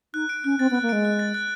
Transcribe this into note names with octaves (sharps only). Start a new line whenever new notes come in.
D#4 F#6
D7
C#4 F#6
C4 A6
B3
F#6
A#3
G#3 D7
F#6
A6
F#6